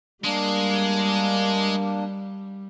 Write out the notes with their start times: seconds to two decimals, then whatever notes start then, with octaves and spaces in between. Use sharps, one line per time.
0.25 G3 G#3 A#3 D4